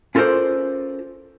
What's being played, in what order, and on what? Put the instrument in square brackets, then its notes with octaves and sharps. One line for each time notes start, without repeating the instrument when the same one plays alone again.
[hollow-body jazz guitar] C#4 F4 A4 A#4 C5 D5